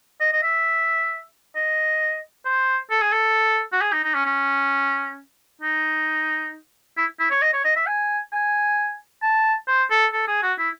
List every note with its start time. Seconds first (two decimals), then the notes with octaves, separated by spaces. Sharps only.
0.20 D#5
0.33 D#5
0.43 E5
1.56 D#5
2.45 C5
2.91 A4
3.02 G#4
3.12 A4
3.72 F#4
3.81 G#4
3.92 D#4
4.04 D#4
4.15 C#4
4.26 C#4
5.62 D#4
6.97 E4
7.19 E4
7.31 C#5
7.42 D#5
7.54 C#5
7.65 D#5
7.76 E5
7.87 G#5
8.32 G#5
9.23 A5
9.68 C5
9.90 A4
10.13 A4
10.28 G#4
10.43 F#4
10.59 E4